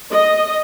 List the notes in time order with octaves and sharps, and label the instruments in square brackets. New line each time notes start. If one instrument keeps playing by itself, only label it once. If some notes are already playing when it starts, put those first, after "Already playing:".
[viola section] D#5